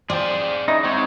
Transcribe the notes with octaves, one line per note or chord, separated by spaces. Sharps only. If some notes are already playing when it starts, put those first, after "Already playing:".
F3 C4 F4 G#4 C5 D5
C#4 D#4 E4 D#5
G#3 C4 D#4 F#4 C#5